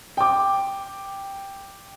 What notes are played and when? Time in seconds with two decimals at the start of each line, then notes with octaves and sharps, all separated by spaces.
0.17 G5 D6